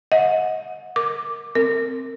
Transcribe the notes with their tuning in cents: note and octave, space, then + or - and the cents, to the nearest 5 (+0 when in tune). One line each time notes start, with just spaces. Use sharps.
D#5 +25 F#5 -25
A#4 +0 D6 +0
C4 +0 A#4 -25